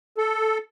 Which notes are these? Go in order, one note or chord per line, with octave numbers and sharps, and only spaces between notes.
A4